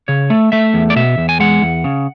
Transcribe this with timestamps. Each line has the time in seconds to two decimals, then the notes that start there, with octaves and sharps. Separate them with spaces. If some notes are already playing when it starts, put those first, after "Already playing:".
0.08 C#3 C#5
0.30 A3
0.52 A3 E5
0.74 E2
0.90 D5
0.96 B2 E5
1.18 E2
1.29 G#5
1.40 G#3 F#5
1.62 E2
1.84 C#3